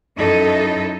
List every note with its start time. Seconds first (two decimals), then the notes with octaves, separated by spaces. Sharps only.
0.18 F#2 D#4 E4 A4 D#5